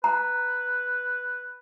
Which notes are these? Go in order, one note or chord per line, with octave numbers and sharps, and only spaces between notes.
B4 A#5